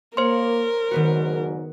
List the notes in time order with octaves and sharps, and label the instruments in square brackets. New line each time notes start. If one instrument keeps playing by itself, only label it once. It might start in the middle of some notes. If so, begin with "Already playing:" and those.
[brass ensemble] A#3 [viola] A#4 [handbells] C5 C6 [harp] C#5
[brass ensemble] F#1 G#2 F#3 [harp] D#3 B3 F#4